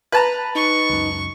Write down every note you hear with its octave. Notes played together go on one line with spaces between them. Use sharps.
B4 A5 A#5
D#4 C#6
C#2 F#2